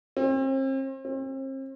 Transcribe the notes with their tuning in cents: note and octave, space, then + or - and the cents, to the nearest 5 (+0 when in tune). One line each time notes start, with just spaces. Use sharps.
C4 +40
C4 +40